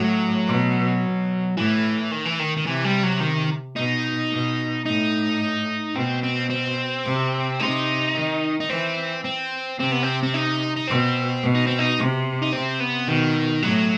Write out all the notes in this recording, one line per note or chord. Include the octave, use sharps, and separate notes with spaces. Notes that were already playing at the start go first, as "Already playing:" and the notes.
Already playing: A2 F#3
B2
B2
A2 E3
D#3
E3
D#3
D#3
C3 E3
G3
F#3
D#3
B2 D#4
B2
A2 D#4
B2 C4
C4
C4
C3
C3 D#4
D#3
D#4
E3 C4
C4
C3 C4
B3
C4
C4
D#4
D#4
B2 C4
B2
D#4
C4
D#4
C3
D#4
C3 C4
B3
B2 D#3
A2 F#3